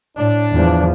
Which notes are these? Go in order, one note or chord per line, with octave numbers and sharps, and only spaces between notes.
A2 D4
E2 F3